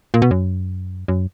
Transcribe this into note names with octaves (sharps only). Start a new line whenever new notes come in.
A#2
B2
F#2
F#2